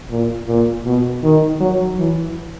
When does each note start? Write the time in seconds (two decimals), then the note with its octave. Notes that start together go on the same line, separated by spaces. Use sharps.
0.10 A#2
0.47 A#2
0.85 B2
1.23 D#3
1.61 F#3
1.99 E3